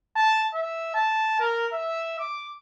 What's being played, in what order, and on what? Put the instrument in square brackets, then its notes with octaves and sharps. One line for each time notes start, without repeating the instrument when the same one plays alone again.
[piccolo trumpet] A5
E5
A5
A#4
E5
D6